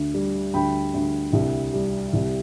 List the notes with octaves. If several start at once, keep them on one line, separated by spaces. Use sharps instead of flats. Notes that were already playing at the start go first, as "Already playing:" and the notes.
Already playing: D2
G3
D2 G5 B5
D2
C2
G3
C2